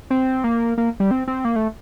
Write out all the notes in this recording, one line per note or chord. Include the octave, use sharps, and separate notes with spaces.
C4
A#3
A#3
G3
C4
C4
A#3
A3